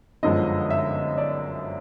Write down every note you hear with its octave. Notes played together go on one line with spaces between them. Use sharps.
G1 F#2 D3 F3 G#3 D#5
E5
D5